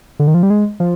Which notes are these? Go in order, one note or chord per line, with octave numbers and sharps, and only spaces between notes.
D3
D#3
F3
G3
G#3
F3